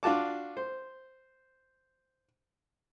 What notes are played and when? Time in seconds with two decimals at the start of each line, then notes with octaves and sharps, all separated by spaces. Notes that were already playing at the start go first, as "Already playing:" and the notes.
0.03 D4 F4 F#4 A5 D6
0.57 C5